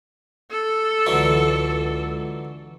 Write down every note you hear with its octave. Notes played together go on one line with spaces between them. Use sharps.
A4
C#2 D3 E3 F#3